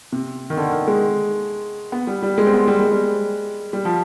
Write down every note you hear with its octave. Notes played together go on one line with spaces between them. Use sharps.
C3
D#3
D3
D#3
G#3
B3
G3
G3
G#3
C4
B3
G3
G#3
G3
G3
F3